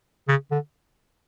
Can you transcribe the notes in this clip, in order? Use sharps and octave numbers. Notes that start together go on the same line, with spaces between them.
C#3
D3